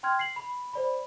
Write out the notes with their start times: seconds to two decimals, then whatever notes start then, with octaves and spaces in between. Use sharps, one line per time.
0.03 G5 C6 F6 G#6
0.19 C7 F#7
0.36 B5
0.73 C5 D5 B5